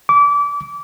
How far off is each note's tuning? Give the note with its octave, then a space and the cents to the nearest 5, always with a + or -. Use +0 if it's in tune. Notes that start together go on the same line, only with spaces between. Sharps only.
D6 -25